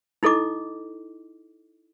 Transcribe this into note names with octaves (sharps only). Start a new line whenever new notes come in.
D#4 E4 A4 D#5 D6